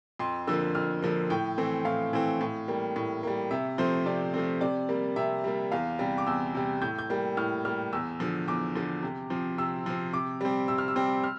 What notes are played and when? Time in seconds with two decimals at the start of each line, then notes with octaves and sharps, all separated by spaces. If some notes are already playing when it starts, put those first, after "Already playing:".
0.19 F2 C6
0.47 D3 F3 A#3 E6
0.75 F2 F6
1.03 D3 F3 A#3
1.30 A2 G5
1.58 E3 A3 C4
1.85 A2 F5
2.13 E3 A3 C4
2.41 A2
2.68 G3 A#3
2.96 A2
3.23 G3 A#3
3.51 C3 E5
3.78 F3 A3 C4 C5
4.06 C3 D5
4.34 F3 A3 C4
4.61 C3 D5
4.89 G3 A#3
5.16 C3 E5
5.44 G3 A#3
5.72 E2 F5
5.99 C3 G3
6.18 D6
6.27 E2 E6
6.55 C3 G3
6.82 A2 G6
6.99 G6
7.10 G3 A#3
7.37 A2 F6
7.65 G3 A#3 F6
7.93 E2 E6
8.20 D3 F3
8.48 E2 D6
8.75 D3 F3
9.03 C3
9.30 F3 C4
9.58 C3 E6
9.86 F3 C4
10.13 C3 D6
10.41 G3 C4
10.68 C3 E6
10.78 F6
10.88 E6
10.96 G3 C4
11.24 F6